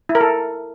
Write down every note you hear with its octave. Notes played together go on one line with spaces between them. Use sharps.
E4
A#4
A4